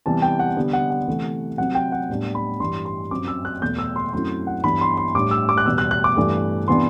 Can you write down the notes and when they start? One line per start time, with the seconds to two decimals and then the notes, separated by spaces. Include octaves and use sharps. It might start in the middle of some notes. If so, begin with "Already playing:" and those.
0.06 C3 E3 G3 B3 A5
0.22 G5
0.39 F#5
0.56 D3 G3 B3
0.73 F#5
0.90 F#5
1.07 C3 E3 A3
1.58 C3 F#3 C4 F#5
1.75 G5
1.92 F#5
2.09 A2 G3 B3 D4
2.35 B5
2.60 G2 E3 G3 C6
2.85 C6
3.11 F#2 F#3 C4 D6
3.28 E6
3.45 F#6
3.62 E2 B2 A3 G6
3.78 E6
3.96 C6
4.13 F#2 F#3 A3 C4 E4 C6
4.47 F#5
4.64 G2 E3 B3 D4 B5
4.81 C6
4.97 C6
5.15 A2 G3 D4 D6
5.31 E6
5.49 D6
5.58 F#6
5.66 E2 B2 G3 E6
5.78 F#6
5.91 F#6
6.04 D6
6.16 G2 E3 A3
6.67 C3 E3 B3 D4 C6